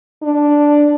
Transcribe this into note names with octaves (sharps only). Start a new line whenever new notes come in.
D4